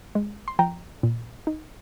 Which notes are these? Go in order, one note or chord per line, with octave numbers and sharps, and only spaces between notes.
G#3
C6
F3 G5 A#5
A#2
D#4